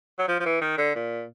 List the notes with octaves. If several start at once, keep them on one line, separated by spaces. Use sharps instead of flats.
F#3
F3
F3
E3
D#3
D3
A#2